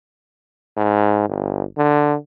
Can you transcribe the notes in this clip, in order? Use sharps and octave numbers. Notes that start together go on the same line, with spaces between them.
G#2
G1
D3